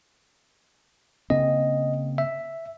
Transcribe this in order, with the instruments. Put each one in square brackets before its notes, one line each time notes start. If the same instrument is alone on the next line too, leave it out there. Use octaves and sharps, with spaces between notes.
[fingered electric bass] C#3 A#3 C4 [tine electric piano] D#5
[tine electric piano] E5